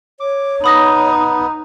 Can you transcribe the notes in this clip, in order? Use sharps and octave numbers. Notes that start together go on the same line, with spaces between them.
C#5 D6
B3 D#4 B5 D#6 A#6